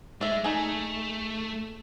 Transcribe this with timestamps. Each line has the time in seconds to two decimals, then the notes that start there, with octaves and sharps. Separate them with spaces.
0.21 G#3 D5 E5
0.44 A3 D#4 G#4